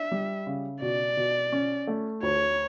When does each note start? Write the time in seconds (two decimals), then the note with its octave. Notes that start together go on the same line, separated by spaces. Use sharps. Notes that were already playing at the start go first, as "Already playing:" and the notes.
Already playing: D4 E5
0.12 G3
0.47 C#3
0.81 B2 D5
1.17 B2
1.52 C#4
1.87 A3
2.23 D2 C#5